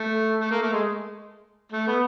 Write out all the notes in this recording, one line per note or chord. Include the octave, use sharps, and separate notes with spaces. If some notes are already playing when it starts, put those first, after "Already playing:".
Already playing: A3
A3
A#3
A3
G#3
A3
B3